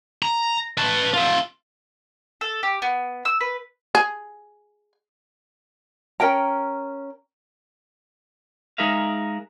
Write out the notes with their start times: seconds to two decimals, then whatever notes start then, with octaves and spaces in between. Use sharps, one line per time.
0.22 A#5
0.77 B4 A5
1.14 F4 E5
2.41 A4
2.63 G4
2.82 B3
3.25 E6
3.41 B4
3.95 G#4
6.20 C#4 A#4 G5 A#5
8.78 G#3 D#4 G#4 A#4 E5 F5